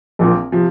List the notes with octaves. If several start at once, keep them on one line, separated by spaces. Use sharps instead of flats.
A#1 A#2 F3 C4
C3 F3